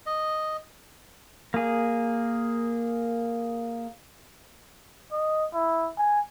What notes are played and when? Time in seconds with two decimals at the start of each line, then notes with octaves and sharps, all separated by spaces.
0.06 D#5
1.54 A#3 G#4
5.12 D#5
5.54 E4
5.98 G#5